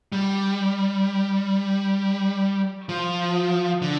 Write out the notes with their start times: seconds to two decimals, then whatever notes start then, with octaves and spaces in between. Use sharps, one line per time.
0.12 G3
2.89 F3
3.82 D3